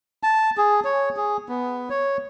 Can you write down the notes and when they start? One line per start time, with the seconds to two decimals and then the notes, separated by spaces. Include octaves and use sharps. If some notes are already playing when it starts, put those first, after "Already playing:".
0.23 A5
0.58 G#4
0.84 C#5
1.16 G#4
1.49 B3
1.90 C#5